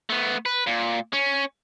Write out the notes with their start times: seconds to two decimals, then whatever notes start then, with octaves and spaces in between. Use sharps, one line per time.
0.10 A3 B3
0.46 B4
0.67 A#2
1.13 C#4